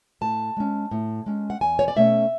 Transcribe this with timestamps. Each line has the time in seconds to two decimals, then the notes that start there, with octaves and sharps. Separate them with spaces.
0.21 A2 A5
0.57 G#3 C#4
0.91 A2
1.26 G#3 C#4
1.50 F#5
1.61 E2 G#5
1.79 C#5
1.88 D5
1.96 B2 A3 C#4 E5